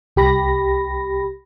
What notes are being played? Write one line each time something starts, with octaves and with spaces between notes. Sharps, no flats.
C2 G4 B5 A#6